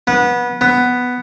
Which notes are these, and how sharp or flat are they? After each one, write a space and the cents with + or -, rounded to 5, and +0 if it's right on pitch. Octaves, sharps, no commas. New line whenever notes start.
B3 -20
B3 +5